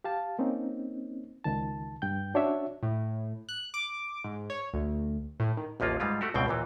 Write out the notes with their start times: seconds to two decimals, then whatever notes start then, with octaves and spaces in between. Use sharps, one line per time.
0.04 G4 F5 A5
0.39 A#3 C4 C#4 D#4
1.44 C#2 D#3 A5
2.02 G2 G5 G6
2.34 C#4 D4 F#4 C#5 E5
2.83 A2
3.49 F#6
3.74 D6
4.24 G#2
4.50 C#5
4.73 D2
5.40 A2
5.57 D#3
5.80 A1 D#2 F3 A#3 F4
6.00 G#2 G3 G#3 F4
6.21 A3 F#4 G4
6.34 C#2 G2 B2 C4 G5
6.48 D#2 A#2 E3